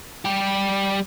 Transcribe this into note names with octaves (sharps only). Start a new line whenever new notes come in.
G3 G4